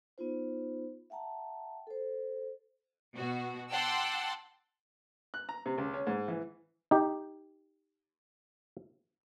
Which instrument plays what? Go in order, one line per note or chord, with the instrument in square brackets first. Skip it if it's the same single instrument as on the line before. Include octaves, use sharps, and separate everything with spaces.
[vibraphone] B3 D#4 F4 C5
E5 F#5 G5 A5 A#5
A4 C5
[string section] B2 F#4
F#5 G5 A5 C6 D6 E6
[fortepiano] F#6
A#5
C3
C#2
C#4
G#2
E3
[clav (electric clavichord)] D#4 G4